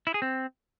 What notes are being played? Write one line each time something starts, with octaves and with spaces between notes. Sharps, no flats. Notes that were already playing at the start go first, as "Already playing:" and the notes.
E4
G#4
C4